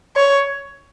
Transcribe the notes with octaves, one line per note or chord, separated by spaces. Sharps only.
C#5